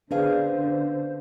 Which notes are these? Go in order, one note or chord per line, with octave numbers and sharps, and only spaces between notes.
D3 B3 C#4 D4 G#4 B4 C5 F5